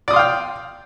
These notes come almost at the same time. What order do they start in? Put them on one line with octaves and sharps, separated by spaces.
D5 D#6 C6 F5 G5